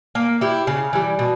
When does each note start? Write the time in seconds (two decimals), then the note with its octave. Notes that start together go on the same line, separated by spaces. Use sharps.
0.15 A#3
0.41 E4 G4
0.67 C#3
0.93 E3 G3
1.19 B2